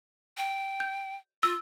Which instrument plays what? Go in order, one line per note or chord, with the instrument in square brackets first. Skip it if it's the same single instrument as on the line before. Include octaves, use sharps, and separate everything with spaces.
[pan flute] G5
[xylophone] G6
[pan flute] F4 [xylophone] E6